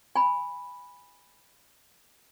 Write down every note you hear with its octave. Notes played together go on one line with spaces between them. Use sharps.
G#5 B5